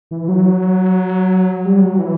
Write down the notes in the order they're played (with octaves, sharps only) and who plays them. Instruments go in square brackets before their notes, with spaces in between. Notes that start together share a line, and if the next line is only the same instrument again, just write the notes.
[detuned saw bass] E3
F#3
G3
F#3
E3